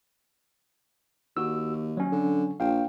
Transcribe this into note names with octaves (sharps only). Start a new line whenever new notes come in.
D#2 F#4 E6
F#3 C#4
D3
A#1 F5 G5